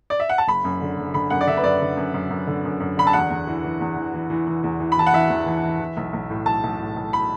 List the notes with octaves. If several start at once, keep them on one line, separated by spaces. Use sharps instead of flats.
D5
E5
F#5
A5
F#1 B5
F#2
D3
F#1
D3 B5
F#2 F#5
D5
D3 E5
B4
F#2 D5
D3
F#2
F#2
F#2
D3
F#2
F#2
D3 B5
A5
E2 F#5
E2
E3
E3
E2
E3
E3
E3
E3
E2
E3
B5
E3 A5
F#5
E3 E5
E2
E3
E3
E3
B1
B1
A2
B1 A5
B1
A2
B1
B5